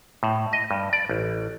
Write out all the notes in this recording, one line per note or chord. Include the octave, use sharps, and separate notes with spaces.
A2
D#5
G2
D5
A1